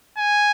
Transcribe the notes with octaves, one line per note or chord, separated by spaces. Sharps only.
G#5